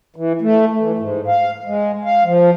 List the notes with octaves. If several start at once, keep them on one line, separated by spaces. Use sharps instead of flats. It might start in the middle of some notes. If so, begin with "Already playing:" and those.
E3
A3
E3
G#2
F5
G#3
F5
F3